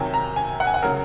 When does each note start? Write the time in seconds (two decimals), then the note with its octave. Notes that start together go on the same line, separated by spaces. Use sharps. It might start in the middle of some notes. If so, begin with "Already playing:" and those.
Already playing: C3 D#3 F#3 G#5
0.14 A#5
0.36 G#5
0.60 F#5
0.67 G#5
0.74 F#5
0.82 C#3 F#3 A#4